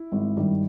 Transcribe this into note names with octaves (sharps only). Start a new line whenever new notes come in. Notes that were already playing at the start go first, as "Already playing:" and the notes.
Already playing: E4
G#1
G2 D#3 G3